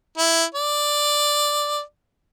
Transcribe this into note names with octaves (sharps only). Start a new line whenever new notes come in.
E4
D5